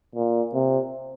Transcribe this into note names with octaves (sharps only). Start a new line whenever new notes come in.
A#2
C3